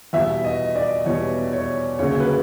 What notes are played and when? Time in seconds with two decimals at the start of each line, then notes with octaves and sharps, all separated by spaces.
0.13 E2 B2 G3 B3 E5
0.45 D#5
0.76 D5
1.06 E2 B2 G3 B3 C#5
1.53 C#5
1.99 D2 C#3 F#3 A#3 C#4 C#5
2.20 B4